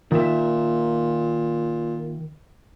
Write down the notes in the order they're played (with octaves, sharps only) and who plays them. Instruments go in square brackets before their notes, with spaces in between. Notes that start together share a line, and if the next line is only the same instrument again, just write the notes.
[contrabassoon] A#2 [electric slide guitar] D#3 E5